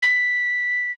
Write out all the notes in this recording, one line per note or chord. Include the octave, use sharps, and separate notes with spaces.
B6